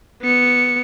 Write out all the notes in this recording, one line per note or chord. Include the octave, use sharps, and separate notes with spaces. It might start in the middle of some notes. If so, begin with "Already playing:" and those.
B3 C#7